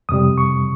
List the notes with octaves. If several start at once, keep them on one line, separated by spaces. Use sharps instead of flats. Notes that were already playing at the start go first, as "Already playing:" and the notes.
F2 C3 G3 D#6
C#6